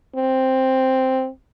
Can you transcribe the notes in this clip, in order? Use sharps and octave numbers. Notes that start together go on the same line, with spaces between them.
C4